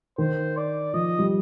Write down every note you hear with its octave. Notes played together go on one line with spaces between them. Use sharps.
D#3 C5
D5
F3 D#5
G3